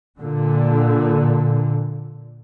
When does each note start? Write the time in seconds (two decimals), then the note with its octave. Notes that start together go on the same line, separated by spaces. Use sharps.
0.18 A#2 D3